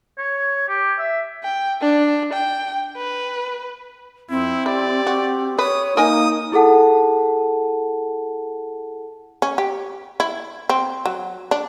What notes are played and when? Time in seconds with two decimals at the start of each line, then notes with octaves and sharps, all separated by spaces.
0.18 C#5
0.69 G4
0.99 E5
1.44 G5
1.82 D4
2.33 G5
2.97 B4
4.30 F2 C4 E4
4.66 E4 G4 D5
5.07 C4 F#4
5.59 B4 C#5 D#6
5.97 A#3 D#4 A#4 D#5 G#5 D#6
6.52 E4 G#4 A4 F#5 A5
9.42 C#4
9.58 G4
10.20 E4
10.69 C4
11.06 F#3
11.51 D4